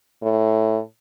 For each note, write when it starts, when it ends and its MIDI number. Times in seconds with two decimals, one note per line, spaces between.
0.22 0.79 45